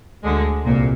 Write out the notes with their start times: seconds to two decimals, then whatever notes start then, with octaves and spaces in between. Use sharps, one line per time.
0.23 D2 D3 G#3
0.65 C2 A#2